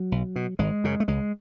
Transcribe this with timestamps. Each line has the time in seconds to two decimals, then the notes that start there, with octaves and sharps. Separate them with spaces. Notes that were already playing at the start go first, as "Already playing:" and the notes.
Already playing: F#3
0.12 B1
0.36 B2
0.59 G#1 G#3
0.84 F#2 C#3
1.00 A3
1.08 C#2 G#3